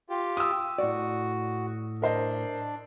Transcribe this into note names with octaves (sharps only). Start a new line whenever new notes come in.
F4 G4
D#6 E6
A2 F#4 D5
D4 A#4 C5 D#5